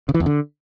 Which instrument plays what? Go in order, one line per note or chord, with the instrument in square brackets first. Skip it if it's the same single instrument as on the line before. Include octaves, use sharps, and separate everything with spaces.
[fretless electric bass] C#3
E3
E2
D3